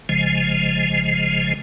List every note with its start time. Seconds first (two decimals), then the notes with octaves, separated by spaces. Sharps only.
0.09 G#1 C#3 F3 G#3